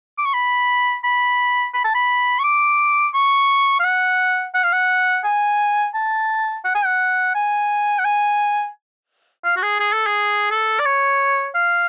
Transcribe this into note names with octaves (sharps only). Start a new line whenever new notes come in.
D6
C#6
B5
B5
B5
A5
B5
C#6
D6
C#6
F5
F#5
F#5
F5
F#5
G#5
A5
F#5
G#5
F#5
G#5
F#5
G#5
F5
F#4
G#4
G#4
A4
G#4
A4
D5
C#5
F5